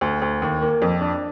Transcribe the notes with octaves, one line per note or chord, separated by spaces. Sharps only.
D2
D2
D#2
A#3
F2
D4